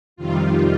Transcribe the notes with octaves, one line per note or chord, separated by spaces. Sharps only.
F2 C3 D#3 G3 F4